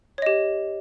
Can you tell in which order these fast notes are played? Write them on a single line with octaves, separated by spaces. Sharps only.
C#5 D#5 G4